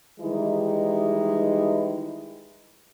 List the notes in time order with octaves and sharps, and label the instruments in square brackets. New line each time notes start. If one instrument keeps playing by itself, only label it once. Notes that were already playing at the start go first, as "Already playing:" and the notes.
[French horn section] D#3 E3 G3 G#3 D#4 E4